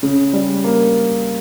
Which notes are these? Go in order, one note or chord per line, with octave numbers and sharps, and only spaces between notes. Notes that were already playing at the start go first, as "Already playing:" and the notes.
C#3
G3
A#3